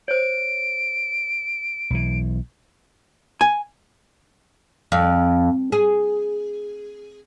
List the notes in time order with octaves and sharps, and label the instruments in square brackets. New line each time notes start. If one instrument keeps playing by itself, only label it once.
[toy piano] C5 C#5 [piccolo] D7
[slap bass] B1 E3
[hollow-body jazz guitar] G#5
[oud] F2
G#4